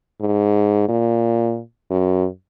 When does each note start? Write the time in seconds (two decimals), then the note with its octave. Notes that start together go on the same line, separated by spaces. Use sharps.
0.21 G#2
0.89 A#2
1.91 F#2